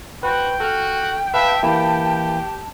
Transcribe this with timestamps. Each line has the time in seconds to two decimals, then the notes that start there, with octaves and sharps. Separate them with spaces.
0.23 F#4 B4 C5 G5
0.60 F#4 A4 F6
1.34 B4 E5 F5 A5
1.63 E3 A#3 E4 G4